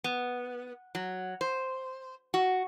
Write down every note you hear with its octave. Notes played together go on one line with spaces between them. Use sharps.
B3
F#3
C5
F#4